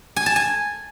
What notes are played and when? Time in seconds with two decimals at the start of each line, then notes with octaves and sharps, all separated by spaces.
0.16 G#5
0.26 A5
0.36 G#5